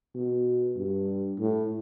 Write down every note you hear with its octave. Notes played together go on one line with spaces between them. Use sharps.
B2
G2
A2